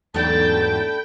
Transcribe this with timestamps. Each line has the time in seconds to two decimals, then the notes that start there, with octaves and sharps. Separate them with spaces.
0.14 E2 G#2 F#3 A3 D4 G5 A5 B5